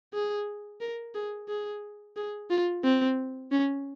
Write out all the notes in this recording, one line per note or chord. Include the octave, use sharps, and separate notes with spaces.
G#4
A#4
G#4
G#4
G#4
F4
C4
C#4